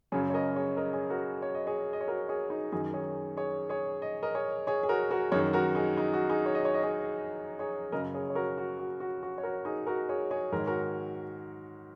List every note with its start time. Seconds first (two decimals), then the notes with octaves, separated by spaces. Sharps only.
0.12 F#2 C#3 G#4 C#5
0.30 C#5
0.34 A#4 D#5
0.56 G#4 C#5
0.77 A#4 D#5
0.93 G#4 C#5
1.10 F#4 A#4
1.42 C#5
1.55 D#5
1.67 G#4 C#5
1.93 D#5
2.01 C#5
2.08 F#4 A#4
2.29 G#4 C#5
2.50 D#4
2.72 F#2 D#3 D#4 G#4
2.94 G#4 C#5
3.37 G#4 C#5
3.69 G#4 C#5
4.02 D#5
4.23 A#4 D#5
4.35 G#4 C#5
4.67 G#4 C#5
4.83 G#4
4.89 F#4 A#4
5.11 F#4 A#4
5.32 F#2 D#3 G#4 C#5
5.53 F#4 A#4
5.75 D#4 G#4
5.97 D#4
6.13 F#4
6.30 D#4 G#4
6.46 C#5
6.55 D#5
6.65 C#5
6.74 D#5
6.83 G#4 C#5
7.59 G#4 C#5
7.92 F#2 C#3 A#4 D#5
8.14 G#4 C#5
8.30 C#5
8.35 F#4 A#4
8.58 F#4
8.79 F#4
9.00 F#4
9.23 F#4
9.38 C#5
9.43 F#4 A#4
9.65 D#4 G#4
9.87 F#4 A#4
10.09 G#4 C#5
10.31 G#4 C#5
10.52 G#2 D#3 A#4
10.60 C#5
10.67 F#4 A#4